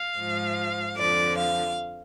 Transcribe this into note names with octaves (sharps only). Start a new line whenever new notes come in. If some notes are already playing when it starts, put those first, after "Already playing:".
Already playing: F5
G#2 F3
F2 D3 F3 D5
F5